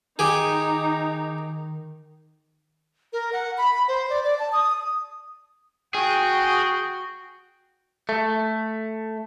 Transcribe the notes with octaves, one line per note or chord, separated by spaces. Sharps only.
D#3 D#4 G4 G#4
A#4
F#5
B5
B5
C5
D5
D5
A5
D#6
F#4 G#4 G5
A3